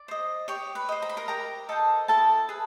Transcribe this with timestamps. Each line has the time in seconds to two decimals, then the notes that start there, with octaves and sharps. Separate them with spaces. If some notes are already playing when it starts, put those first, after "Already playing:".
Already playing: D5
0.08 C5 D#5
0.48 G4 C#5 C#6
0.75 B4 B5
0.89 C5 D#5
1.02 A#5
1.09 B5
1.17 A#4 A#5
1.28 G4 A#4 A#5
1.69 A4 C5 D#5 A5
2.08 E4 A4 A5
2.49 G#4 B4